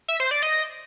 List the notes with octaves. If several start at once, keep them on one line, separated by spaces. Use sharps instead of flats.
E5
C5
D5
D#5